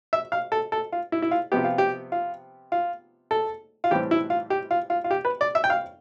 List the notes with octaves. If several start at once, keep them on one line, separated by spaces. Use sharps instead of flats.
E5
F5
A4
A4
F4
E4
E4
F4
C3 F3 B3 G4
F4
G4
F4
F4
A4
F4
A2 E3 G3 C4 G4
E4
F4
G4
F4
F4
F4
G4
B4
D5
E5
G5
F5